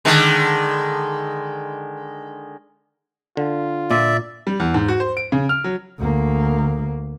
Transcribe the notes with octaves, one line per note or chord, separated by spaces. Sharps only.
D3 D#3 G#3
D3 F4
A#2 D5 E5
G3
E2
G#2
F#4
C5
D7
C#3
F6
F#3
D2 A#3